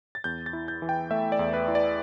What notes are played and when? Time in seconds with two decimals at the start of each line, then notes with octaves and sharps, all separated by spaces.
0.15 A6
0.24 E2 G6
0.46 A6
0.53 E4
0.68 G6
0.82 E3
0.89 G5
1.11 A3 E5
1.32 D5
1.39 E2
1.53 B4
1.68 E4
1.75 D5